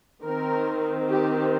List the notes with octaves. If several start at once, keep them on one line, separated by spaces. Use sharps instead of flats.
D#3 C4 A#4
G4